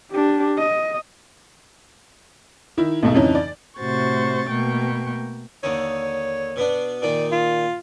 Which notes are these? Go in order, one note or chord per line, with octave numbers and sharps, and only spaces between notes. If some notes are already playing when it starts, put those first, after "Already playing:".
D4 G4
D#5
D#3 E4
B1 G#2 B2 A3
F2 C#3 E3 C#4 D#4
D5
A2 C3 F#4 C5 C#6 A6
B2 A3 A#3 G5 C#6
D#2 D3 D#4 C#5
B2 B3 D4
A#2 D#3 D#4 D5
F4